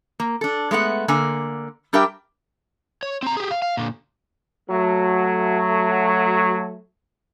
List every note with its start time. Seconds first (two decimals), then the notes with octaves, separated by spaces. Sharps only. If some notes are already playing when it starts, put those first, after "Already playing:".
0.20 A#3
0.41 D4 A4
0.71 G#3 A3 B3 F#5
1.08 D3 A#3 G#5
1.93 G3 D4 G4 A#4 E5 G5
3.03 C#5
3.23 C4 A#5
3.37 G4 G#4
3.51 F5
3.62 F5
3.77 A#2 D3
4.70 F#3 A3